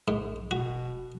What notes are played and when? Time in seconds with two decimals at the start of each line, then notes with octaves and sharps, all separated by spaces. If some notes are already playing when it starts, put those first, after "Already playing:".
0.08 A#1 G#2
0.51 E1 B2 F#4